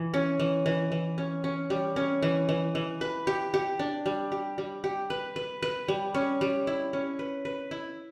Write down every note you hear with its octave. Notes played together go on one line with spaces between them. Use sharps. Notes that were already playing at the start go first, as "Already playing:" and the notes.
Already playing: E3
C#4
E3
E3
E3
C#4
C#4
G3
C#4
E3
E3
E3
B4
G4
G4
D4
G3
G4
G3
G4
B4
B4
B4
G3
C#4
G3
E4
C#4
B4
B4
E4